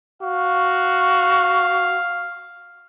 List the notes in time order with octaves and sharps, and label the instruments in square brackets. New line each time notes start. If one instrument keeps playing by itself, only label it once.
[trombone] F#4 [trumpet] F5